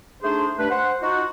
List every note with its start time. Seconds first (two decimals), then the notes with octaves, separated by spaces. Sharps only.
0.23 A3 D4 D#4 G#4 C5
0.58 G2 A3 D4 B4
0.70 C5 F#5
1.02 D#4 F4 F#4